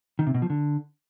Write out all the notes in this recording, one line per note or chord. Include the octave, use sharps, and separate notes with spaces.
D#3
C3
B2
F3
D3